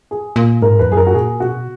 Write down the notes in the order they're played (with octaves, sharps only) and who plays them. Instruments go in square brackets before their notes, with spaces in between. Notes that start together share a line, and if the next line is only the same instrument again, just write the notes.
[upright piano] G#4
[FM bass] A#2
[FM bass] G#2 [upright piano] A#4
[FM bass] E2 [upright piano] B4
[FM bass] F#2 [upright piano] G#4
[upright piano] A#4
F#4
[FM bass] A#2 [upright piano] G#4
[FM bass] B2 [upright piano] F#4